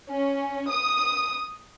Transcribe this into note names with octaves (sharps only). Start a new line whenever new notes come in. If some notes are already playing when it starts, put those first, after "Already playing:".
C#4
D#6